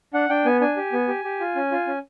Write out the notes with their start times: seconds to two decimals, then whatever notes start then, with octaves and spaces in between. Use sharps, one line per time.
0.14 D4 F#5
0.30 D4 G5
0.45 B3 G#5
0.61 D4 G#5
0.77 G4
0.92 B3
1.08 G4
1.24 G4
1.40 F4
1.56 C#4
1.72 F4
1.87 C#4